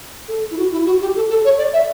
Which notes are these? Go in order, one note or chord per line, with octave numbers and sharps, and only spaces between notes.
A4
E4
F#4
E4
F#4
G4
A4
A4
C#5
D5
E5